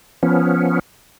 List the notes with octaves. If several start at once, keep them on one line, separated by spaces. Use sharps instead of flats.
F3 B3 C#4